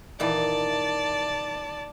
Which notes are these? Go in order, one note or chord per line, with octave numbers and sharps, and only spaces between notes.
A#2 D#3 E3 D5 A5